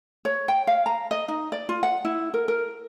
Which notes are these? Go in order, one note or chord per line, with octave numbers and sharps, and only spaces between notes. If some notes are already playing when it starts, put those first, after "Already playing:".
C#5
G5
F5
A#5
D#5
D#4
D5
F4
F#5
E4
A#4
A#4